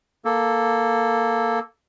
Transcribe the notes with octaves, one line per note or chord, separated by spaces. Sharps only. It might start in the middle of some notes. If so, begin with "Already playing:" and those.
A#3 A4